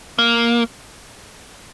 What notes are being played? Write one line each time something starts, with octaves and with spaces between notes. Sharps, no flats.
A#3